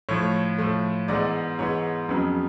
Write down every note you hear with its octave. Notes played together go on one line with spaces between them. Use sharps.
A2 F3 A3 C#5
A2 F3 A3
G#2 E3 G#3 B3 D5
G#2 E3 G#3 B3 C#5
F2 C#3 F#3 B3